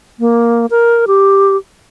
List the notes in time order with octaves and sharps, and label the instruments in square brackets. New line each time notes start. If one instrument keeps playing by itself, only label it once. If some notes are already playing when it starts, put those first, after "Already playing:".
[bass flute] A#3
A#4
G4